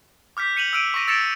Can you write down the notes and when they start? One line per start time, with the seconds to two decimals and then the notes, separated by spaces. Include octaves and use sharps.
0.37 D6 F6 G6 B6
0.56 G6 C#7 D#7 F7 F#7
0.73 E6 F6 D7 D#7
0.94 C#6 D6 A#6 D#7
1.08 E6 A6 A#6 C#7 D7 E7